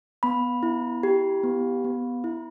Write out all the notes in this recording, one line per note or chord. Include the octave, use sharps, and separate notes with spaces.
B3 B5
E4
G4
B3
B3
E4